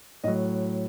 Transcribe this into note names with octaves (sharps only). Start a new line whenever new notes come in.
A2 F#3 D#5